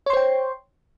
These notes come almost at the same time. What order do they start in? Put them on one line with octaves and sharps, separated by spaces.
C#5 C6 C5 G5